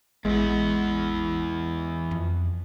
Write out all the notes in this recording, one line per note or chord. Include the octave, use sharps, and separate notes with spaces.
A1 E2 G#3 B3
F2